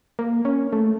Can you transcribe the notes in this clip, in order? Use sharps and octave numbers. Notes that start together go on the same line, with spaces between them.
A#3
C#4
A3